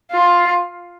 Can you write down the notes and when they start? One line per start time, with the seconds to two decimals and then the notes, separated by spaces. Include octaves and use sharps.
0.12 F4